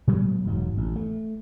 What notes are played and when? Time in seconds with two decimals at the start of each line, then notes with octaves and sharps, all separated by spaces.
0.07 A#2 F#3 G#3 B3
0.44 E1 G#2 F#3
0.77 A1
0.96 A3